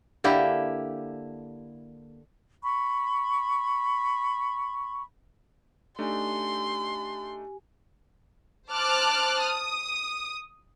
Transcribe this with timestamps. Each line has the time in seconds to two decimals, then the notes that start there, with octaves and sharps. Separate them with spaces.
0.24 D3 A#3 E4 G4
2.63 B5 C#6
5.99 A3 D4 D#4 G4 G#5 C6
8.70 C5 A5 D6 F6 F#6
9.42 D#6